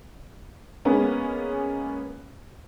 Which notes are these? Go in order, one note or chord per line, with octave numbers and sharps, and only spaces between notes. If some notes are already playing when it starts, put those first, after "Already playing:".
G#3 A#3 B3 C#4